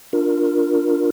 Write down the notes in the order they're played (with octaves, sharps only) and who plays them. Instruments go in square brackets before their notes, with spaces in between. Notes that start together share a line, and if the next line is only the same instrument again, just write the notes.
[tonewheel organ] D4 F4 A#4